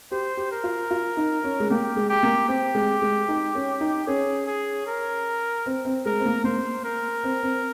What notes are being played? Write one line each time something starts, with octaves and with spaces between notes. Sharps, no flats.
G4 C5
G4
A#4
F4
F4
D#4
C#4
G#3
A#3 G4
G#3
G4
A#3
C4 G4
G#3
G#3
D#4
C#4
D#4
C#4 G#4
G#4
A#4
C4
C4
G#3 A#4
C4
A#3
A#3 C5
A#4
C4
C4